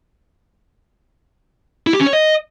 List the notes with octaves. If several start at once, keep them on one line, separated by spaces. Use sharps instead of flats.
E4
G4
C#4
C#5
D#5